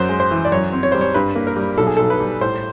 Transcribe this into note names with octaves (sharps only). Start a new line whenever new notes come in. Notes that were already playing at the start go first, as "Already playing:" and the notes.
Already playing: F#2 C5
G#3
C5
E3
D5
F#2 C#5
C4
C#5
G3 C5
C#5
G2 B4
A#3
A#4
G3
B1 A4
G#4
B1 A4
B4
G3
A2 C5